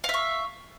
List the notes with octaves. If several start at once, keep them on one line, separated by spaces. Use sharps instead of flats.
E5 F5 C#6